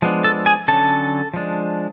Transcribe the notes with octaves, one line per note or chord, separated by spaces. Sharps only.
F3 G#3 B3 D4
A4 A5
G#4 G#5
D3 F#3 C#4 A4 A5
F3 G#3 D4